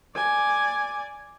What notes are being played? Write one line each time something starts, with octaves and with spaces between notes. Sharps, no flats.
D5 G#5